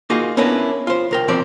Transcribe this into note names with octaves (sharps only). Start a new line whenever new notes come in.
A#3 D#4 F4 F#4 G#4 D#5
B3 C#4 D4 E4 A#4 B4
F4 C5
C2 A#4 G5
E2 B2 F3 C4 D5